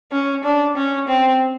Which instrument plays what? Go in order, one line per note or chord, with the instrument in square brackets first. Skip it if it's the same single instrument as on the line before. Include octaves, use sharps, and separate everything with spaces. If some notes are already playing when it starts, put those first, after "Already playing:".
[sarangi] C#4
D4
C#4
C4